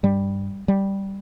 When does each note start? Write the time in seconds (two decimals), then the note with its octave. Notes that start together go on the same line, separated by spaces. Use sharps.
0.03 G2 G3
0.68 G3